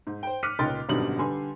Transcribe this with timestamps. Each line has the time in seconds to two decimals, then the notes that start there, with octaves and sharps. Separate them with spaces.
0.07 G#2
0.23 C5 G5
0.43 D6 F6 F#6 B6 C#7 D#7
0.59 C#2 A#2 D#4 G5 C6 A6
0.89 G#1 F#2 B2 D3 G3 F#7
1.19 D3 G3 B4 G#5 C6